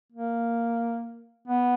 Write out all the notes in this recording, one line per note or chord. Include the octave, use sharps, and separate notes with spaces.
A#3
B3